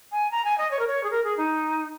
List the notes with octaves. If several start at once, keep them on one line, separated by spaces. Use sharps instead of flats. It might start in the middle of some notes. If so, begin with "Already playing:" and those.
G#5
A#5
G#5
D#5
C#5
A#4
C#5
G#4
A#4
G#4
D#4